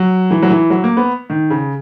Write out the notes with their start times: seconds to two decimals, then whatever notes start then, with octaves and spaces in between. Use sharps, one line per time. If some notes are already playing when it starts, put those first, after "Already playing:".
Already playing: F#3
0.31 E3
0.42 F#3
0.50 E3
0.70 F#3
0.84 A#3
0.97 B3
1.30 D#3
1.50 C#3